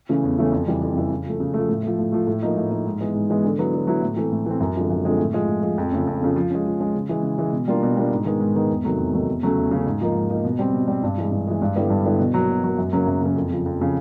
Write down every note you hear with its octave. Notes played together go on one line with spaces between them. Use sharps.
C#3 E3 A3 C#4
E2
C#3 E3 A3 C#4
F2
C#3 E3 G3
F2
C#3 E3 G3
C#3
F3 A3
C#3
F3 A3
A2
F3 A3
A2
F3 A3
A2
F3 A#3 D#4
A2
F3 A#3 D#4
G#2
E3 G#3 B3
G#2
E3 G#3 B3
D3
F#3 B3 E4
D3
F#3 B3 E4
A2
E3 A3 C4
A2
E3 A3 C4
F#2
D3 F3 G#3 C4
F#2
D3 F3 G#3 C4
A2
F3 G#3
A2
F3 G#3
F2
C#3 F3 A3 C#4
F2
C#3 F3 A3 C#4
F3
G#3 C#4
F3
G#3 C#4
C#3
E3 G#3
C#3
E3 G#3
B2
G3 A#3 D4 F4
B2
G3 A#3 D4 F4
G#2
D#3 G#3 B3
G#2
D#3 G#3 B3
E2
C3 D#3 F#3 A3
E2
C3 D#3 F#3 A3
E2
C#3 F#3 A3 C#4
E2
C#3 F#3 A3 C#4
G#2
F3 A#3 D#4
G#2
F3 A#3 D#4
B2
G3 C4
B2
G3 C4
G2
E3 G#3
G2
E3 G#3
G2
D3 G3 B3 E4
G2
D3 G3 B3 E4
B2
F#3 A#3
B2
F#3 A#3
F#2
C#3 F#3 A#3 C#4
F#2
C#3 F#3 A#3 C#4
F2
C#3 F3
F2
C#3 F3